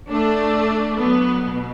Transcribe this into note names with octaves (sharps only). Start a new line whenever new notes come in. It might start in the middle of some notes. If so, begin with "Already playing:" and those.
A3 D4
F#3 B3
B2